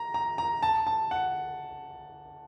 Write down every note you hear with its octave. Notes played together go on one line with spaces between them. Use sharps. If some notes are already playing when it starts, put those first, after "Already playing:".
Already playing: A#5
A#5
A#5
A5
A5
F#5